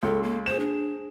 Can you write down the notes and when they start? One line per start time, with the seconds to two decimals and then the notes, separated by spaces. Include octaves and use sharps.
0.03 C#2 A4
0.23 A#3
0.46 G#4 C5 E7
0.60 D4